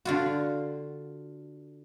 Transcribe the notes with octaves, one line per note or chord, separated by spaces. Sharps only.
D3 F4 F#4